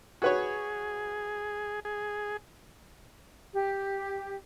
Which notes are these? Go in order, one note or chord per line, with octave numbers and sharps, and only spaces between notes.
F#4 G#4 B4 C#5
G#4
G4